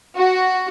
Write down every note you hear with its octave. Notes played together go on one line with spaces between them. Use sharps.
F#4